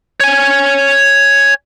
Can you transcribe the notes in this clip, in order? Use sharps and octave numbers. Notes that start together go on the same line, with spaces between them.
C#5 G#5